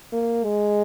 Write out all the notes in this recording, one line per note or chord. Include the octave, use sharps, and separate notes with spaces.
A#3
G#3